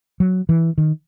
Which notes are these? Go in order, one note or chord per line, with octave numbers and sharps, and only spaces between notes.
F#3
E3
D#3